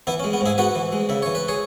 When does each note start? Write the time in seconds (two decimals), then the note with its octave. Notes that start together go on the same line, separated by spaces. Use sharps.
0.07 E3 B3 E4
0.20 C#4
0.24 G#3
0.33 B3
0.41 G#2 E4 G#4
0.58 B3 F#4 B4
0.75 E3
0.92 G#3
1.09 C#3 E5
1.22 E3 C#5
1.35 B4
1.48 G#4 C#5